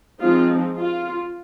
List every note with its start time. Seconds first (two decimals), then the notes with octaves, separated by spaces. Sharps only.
0.20 F3 G#3 C4 D#4 F4
0.78 F4